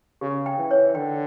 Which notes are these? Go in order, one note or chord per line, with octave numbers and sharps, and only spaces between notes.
C#3 G4
G5
E3
C#5
D3 G5